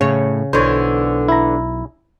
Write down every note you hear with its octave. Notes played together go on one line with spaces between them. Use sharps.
A2 C#3 C#5
B1 D3 E3 C5 C#5
E4 A#5